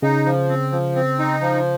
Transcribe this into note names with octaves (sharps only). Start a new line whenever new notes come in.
C#3 D#4
F3
C4
F3
C4
D#4
F3